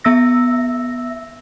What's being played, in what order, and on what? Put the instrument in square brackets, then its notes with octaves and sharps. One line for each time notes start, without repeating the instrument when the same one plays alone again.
[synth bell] B3 E5 E6 A#6